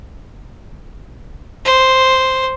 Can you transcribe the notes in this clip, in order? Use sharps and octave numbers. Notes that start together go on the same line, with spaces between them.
C5